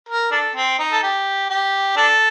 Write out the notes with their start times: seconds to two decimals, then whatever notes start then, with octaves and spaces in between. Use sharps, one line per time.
0.09 A#4
0.32 D4 A4
0.56 C4
0.79 D#4
0.92 A4
1.03 G4
1.50 G4
1.97 D4 A4